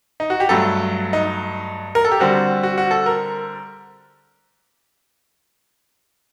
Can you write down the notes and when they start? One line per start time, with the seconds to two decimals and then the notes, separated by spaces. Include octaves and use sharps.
0.20 D#4
0.30 F#4
0.40 G4
0.49 G2 F#3 A3 A4
1.13 D#4
1.95 A#4
2.05 A4
2.11 G4
2.20 D3 G3 C4 F#4
2.63 F#4
2.78 F#4
2.91 A4
3.06 A#4